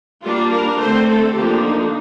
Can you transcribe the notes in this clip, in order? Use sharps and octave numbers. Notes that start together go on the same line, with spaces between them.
G3 A#3 D4 F4
A#4
D3 A3 C4 C5
A4
D3 F3 A#3 D4 G4
D#4